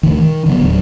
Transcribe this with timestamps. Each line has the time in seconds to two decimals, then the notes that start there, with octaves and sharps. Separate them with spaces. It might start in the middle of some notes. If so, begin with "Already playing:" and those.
0.03 D2 D#3
0.21 D#3
0.46 D3 F#3 B3
0.60 D1 D#2 D3 F#3